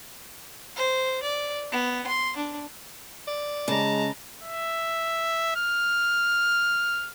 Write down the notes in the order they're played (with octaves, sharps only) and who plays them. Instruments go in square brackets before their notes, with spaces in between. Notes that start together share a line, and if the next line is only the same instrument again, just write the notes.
[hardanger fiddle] C5
D5
B3
C6
D4
[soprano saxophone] D5
[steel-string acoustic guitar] C#3 [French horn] G#3 [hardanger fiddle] A5 A#5
[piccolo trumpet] E5
F6